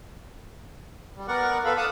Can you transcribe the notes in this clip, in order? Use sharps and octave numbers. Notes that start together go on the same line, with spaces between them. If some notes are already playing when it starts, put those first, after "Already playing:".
G3
B3 A#4 D5 F#5 C#6
B3 F4 A4 B4 F5 B5
D5 F5 F#5 A5 D6 D#6